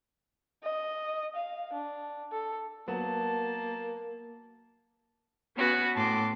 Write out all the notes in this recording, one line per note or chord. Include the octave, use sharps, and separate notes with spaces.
D#5
F5
D4
A4
F#3 A#3 B3 A5
B3 C#4 F#4 B4
A2 A5 C6 D6